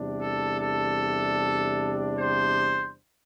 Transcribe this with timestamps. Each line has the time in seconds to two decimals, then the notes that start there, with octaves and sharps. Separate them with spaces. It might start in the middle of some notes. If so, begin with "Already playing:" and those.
Already playing: E2 C3 G3 D4
0.19 A4
0.59 A4
2.17 C5